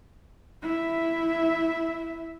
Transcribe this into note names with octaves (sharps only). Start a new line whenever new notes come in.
E4 E5